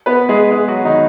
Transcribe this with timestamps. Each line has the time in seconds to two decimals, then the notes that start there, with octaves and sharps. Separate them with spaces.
0.06 B3 B4
0.29 G#3 G#4
0.51 G#3 G#4
0.68 F#3 F#4
0.85 D#3 D#4